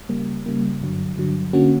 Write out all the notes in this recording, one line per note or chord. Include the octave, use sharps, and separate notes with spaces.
C#3 G3 A#3
C#3 G3 A#3
G2 D3 F#3
G2 D3 F#3
D3 A#3 C#4 F#4